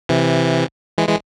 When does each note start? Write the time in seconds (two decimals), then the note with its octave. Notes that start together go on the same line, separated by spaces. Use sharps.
0.09 C3 E3
0.98 E3 G#3
1.08 E3 G#3